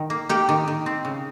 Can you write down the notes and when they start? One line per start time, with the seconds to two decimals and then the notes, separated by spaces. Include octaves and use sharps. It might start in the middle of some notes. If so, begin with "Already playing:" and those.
Already playing: D#3
0.10 A#3
0.29 A#3 G4
0.49 D#3
0.68 D#3
0.86 C4
1.05 C#3